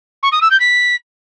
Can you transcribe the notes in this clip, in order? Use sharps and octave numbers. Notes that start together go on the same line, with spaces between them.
C#6
D#6
E6
G6
B6